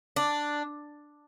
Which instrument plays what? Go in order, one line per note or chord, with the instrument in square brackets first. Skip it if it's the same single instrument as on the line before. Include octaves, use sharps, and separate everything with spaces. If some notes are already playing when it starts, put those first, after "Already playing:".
[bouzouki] D4